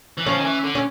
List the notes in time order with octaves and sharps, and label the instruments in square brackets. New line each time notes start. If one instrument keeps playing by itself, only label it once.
[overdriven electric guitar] E3
[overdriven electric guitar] F3 [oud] C#4
[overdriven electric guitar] D#3
E3
D3
[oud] C#4